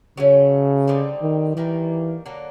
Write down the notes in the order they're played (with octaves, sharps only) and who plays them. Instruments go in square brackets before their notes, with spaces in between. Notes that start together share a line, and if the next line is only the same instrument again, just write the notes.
[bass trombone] C#3 [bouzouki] F#3 A3 C#4
[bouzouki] D3 G3 C4 D#4
[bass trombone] D#3
[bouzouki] D#3 G3 A#3 [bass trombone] E3
[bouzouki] D3 F#3 A#3